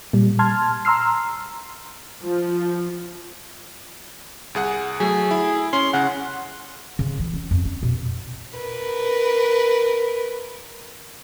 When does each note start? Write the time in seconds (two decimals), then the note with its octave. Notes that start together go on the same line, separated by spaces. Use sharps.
0.13 A#2 G3
0.39 A5 C6 F6 G#6
0.85 A#5 C6 E6 F6 C7
2.22 F3
4.55 C2 G#4 F#5
5.00 F#3 A3 G#4
5.31 E4
5.73 C#4 C6
5.94 C#3 C#4 F#5
6.99 C#3
7.19 E3
7.34 C#4
7.51 F2
7.65 C#4
7.83 B2
8.58 A#4 B4